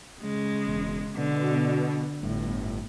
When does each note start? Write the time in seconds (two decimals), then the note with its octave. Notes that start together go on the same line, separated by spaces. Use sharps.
0.22 C#3 G#3
0.66 E1
1.17 B2 D3
2.22 G1 A2